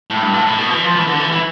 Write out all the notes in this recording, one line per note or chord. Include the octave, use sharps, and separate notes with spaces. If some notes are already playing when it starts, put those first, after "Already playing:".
A2
G2
A2
A2
B2
E3
F3
E3
D3
E3
E3